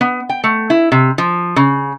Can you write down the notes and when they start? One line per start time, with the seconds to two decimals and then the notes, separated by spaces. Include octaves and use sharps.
0.01 B3
0.29 G5
0.44 A3
0.70 E4
0.92 C3
1.18 F3
1.56 C#3